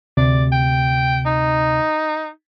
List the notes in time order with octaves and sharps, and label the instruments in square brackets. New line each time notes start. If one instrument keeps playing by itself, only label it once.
[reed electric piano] D2 C3 [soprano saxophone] D5
[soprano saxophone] G5
D#4